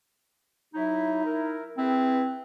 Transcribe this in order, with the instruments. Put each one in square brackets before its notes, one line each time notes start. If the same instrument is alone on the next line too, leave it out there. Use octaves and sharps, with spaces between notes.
[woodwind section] F#3 E4 [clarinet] D#4
[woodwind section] E4 A#4
[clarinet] C4 [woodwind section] E4 G#4 B4